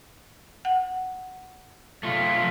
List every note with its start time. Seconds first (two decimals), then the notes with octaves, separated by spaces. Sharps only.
0.65 F#5
2.03 A3 F4